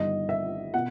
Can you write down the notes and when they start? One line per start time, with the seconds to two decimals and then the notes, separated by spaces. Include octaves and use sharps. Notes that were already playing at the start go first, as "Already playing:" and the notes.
Already playing: G1 G2 D#3 D#5
0.29 E5
0.74 B2 F#5